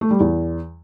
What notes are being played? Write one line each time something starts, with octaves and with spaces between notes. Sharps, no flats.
A3
G3
E2